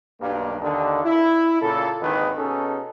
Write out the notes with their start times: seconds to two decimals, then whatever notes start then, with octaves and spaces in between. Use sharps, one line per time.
0.20 B1 G2 A#3
0.61 D#2 D3
1.05 E4
1.61 A#2 C#3 A4
2.01 G#1 D#2 D3 D#3 D#4 B4
2.37 B2 C#4 D#4 G#4 A4